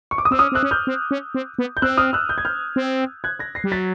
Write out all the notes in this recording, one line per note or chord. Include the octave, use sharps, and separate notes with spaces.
C#6
D6
D#6
C4 E6
C#4 D#6 F6
C4 E6 F#6
C#4
F6 G6
C4
C#4
C4
B3
G6
C4 E6 F#6
D#6 F6
E6 F#6
G6
G#6
F6 G6
C4
F#6 G#6
G#6 A#6
A#6 C7
G3
F#3 A6 B6